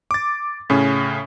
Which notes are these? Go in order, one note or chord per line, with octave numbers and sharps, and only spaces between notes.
D6 A6
A2 C#3 C#4